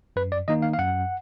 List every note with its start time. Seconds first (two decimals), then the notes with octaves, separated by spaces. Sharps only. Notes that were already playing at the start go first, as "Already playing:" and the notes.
0.16 F#2 B4
0.32 D5
0.48 D#3 A#3 D#4 D#5
0.62 F5
0.73 F5
0.79 F#2 F#5